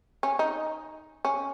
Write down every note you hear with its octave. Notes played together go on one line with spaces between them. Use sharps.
C#4
D#4
C#4